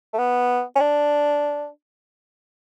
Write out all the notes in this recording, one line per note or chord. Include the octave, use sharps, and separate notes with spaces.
A3
B3
C#4
D4